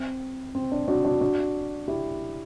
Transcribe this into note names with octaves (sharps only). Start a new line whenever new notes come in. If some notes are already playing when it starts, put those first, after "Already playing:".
Already playing: C4
C4
D4
D4 F#4
D4 F#4
D4 F#4
E4 G4